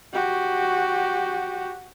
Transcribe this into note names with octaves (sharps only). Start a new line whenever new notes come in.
F#4 G4